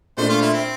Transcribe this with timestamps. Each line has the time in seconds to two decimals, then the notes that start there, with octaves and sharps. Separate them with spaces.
0.17 A#2 A3 D4 C5
0.29 F4
0.42 E4
0.53 C4